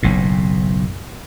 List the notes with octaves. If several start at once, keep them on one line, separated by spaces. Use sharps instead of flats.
F#1 B1 A2